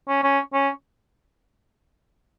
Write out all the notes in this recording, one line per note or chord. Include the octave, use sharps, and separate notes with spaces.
C#4
C#4
C#4